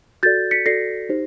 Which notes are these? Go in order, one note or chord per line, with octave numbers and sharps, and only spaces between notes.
F#4 A4 D5 G6 A6
B6 C#7
F#4 A4 D5 A#6 C7
D#4 G4 C5